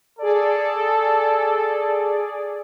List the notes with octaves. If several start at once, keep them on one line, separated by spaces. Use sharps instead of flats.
G#4 A4 D5